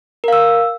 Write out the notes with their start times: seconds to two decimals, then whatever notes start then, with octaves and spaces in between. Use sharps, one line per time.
0.24 A#4
0.28 F5
0.33 E6